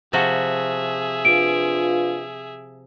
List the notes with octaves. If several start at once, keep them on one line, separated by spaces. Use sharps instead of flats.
C3 F3 F#4 G#4 E5
D4 F4 B4 D7